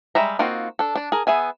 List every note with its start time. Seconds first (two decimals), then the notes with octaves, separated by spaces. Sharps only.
0.15 G3 G#3 E5 A#5
0.39 A#3 C4 D#4 F4 F#4
0.79 D4 A4
0.95 D4 D5
1.12 G#4 A#4
1.27 B3 G#4 E5 G#5